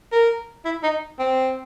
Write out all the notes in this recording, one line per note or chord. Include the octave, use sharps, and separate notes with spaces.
A#4
E4
D#4
C4